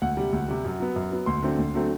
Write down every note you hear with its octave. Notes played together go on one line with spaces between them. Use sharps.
D2 F#5
C3 G3
D2
C3 G3
F#2
F#3 B3
F#2
F#3 B3
D2 C6
D3 F#3 A3 C4
D2
D3 F#3 A3 C4